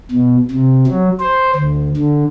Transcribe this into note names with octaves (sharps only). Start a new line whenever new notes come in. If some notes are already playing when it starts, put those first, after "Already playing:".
B2
C3
F#3
C5
D2
D3